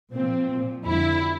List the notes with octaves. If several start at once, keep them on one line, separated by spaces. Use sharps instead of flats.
A#2 F3 C4
A#2 F3
F2 D3 G3 E4